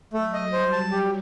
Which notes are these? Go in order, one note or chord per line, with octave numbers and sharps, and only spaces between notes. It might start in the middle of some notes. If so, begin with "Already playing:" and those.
F#3 A3
D#5
G3 C5
A5
G4